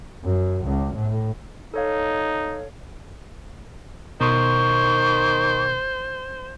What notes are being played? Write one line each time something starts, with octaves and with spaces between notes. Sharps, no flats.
F#2
C#2
A2
D#4 A4 C#5 F5
B2 D#3 C5 C6 C#6